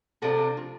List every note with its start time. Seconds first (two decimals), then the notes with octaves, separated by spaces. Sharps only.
0.22 C3 F3 D4 A4
0.57 F4